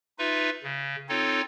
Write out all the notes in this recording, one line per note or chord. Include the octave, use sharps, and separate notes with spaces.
D#4 F4 B4 E5
C#3
C4 D#4 F4 A4 C#5